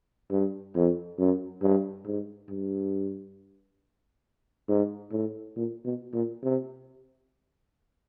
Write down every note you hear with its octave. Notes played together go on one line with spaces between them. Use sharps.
G2
F2
F#2
G2
G#2
G2
G#2
A2
A#2
B2
A#2
C3